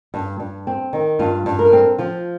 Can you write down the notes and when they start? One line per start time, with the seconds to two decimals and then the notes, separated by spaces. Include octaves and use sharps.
0.14 G2
0.40 G2
0.67 C4
0.93 D#3
1.19 G2 F4
1.46 G2
1.59 A#4
1.73 C4
1.98 F3 F4